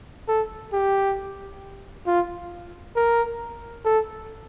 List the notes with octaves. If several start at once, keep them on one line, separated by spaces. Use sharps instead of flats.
A4
G4
F4
A#4
A4